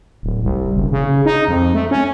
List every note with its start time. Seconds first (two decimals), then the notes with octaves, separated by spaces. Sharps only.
0.23 D1
0.43 C2
0.75 F#1
0.92 C#3
1.26 D#4
1.48 F2
1.74 A3
1.91 C#4